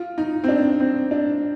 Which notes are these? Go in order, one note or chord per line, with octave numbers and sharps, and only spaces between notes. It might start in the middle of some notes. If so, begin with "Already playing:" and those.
Already playing: F4
D#4
C4
D4
C4
D4